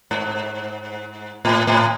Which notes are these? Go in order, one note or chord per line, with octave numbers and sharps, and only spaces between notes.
G#2
A2
A2